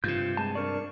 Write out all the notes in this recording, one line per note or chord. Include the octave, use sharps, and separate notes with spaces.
G2 C3 F4 G6
G#3 A5
D4 A#4 D5 C#6